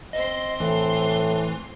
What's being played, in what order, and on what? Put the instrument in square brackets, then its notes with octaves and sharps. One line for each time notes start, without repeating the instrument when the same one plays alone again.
[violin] C4 C6 [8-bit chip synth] D#5
[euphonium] A2 [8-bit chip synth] E3